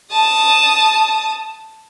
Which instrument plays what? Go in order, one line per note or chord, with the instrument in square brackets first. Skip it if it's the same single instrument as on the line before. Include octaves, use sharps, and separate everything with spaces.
[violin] A5 D#6